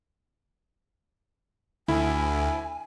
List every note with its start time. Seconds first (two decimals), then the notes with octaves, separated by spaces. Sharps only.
1.88 D2 E4 G#5